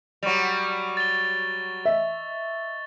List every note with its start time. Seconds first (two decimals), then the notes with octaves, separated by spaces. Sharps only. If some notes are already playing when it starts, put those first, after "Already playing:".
0.23 F#3 G3 C#6 F7
0.97 A6 G7
1.85 D#5 E5